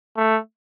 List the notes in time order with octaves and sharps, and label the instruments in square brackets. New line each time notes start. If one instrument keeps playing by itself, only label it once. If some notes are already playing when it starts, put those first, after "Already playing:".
[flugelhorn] A3